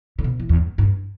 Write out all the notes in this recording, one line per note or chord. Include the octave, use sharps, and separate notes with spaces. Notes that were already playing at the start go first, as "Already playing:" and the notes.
D3
B2
E3
E2
G2
G2